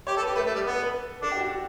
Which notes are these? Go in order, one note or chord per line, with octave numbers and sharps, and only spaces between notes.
G4 C#5
A4
B4
G4
A3 B4
A3
G3
B3 B4
A4
B4
D4 A4
G4
F#4
F#4